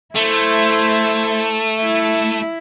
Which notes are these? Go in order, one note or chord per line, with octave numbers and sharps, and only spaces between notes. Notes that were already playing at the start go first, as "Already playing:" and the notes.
A3 E4 C5
E4